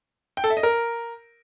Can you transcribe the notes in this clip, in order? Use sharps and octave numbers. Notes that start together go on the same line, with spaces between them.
G5
A4
E5
D#5
A#4